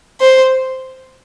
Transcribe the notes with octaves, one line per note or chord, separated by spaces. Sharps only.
C5